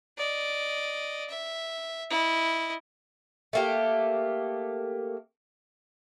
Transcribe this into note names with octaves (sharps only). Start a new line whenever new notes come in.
D5 D#5
E5
E4 D#5
A3 A#3 G4